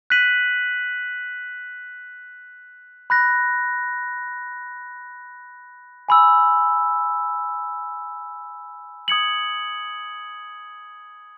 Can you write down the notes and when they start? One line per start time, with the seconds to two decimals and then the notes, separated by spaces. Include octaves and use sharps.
0.10 F#6 B6 D#7 F#7
3.10 B5 F#6 A#6
6.09 G#5 B5 E6
9.08 D#6 G#6 C#7 F#7